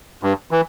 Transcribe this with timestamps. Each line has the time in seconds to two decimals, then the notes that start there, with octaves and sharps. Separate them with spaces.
0.23 G2
0.51 E3